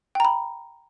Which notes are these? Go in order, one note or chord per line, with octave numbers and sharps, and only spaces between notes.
G5 A#5 B5